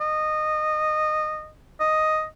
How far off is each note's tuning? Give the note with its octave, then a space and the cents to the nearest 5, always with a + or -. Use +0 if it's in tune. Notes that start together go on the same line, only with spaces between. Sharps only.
D#5 -15
D#5 +0